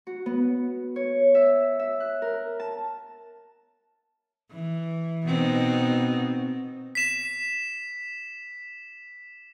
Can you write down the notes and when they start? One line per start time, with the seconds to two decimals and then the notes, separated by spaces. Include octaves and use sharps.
0.07 F#4
0.26 B3
0.96 C#5
1.35 E5
1.79 E5
2.00 F#6
2.22 A#4
2.60 A5
4.51 E3
5.27 B2 C4 D#4
6.95 B6 E7